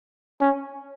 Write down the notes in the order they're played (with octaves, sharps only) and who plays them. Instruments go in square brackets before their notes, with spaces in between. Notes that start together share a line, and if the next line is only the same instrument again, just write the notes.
[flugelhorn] C#4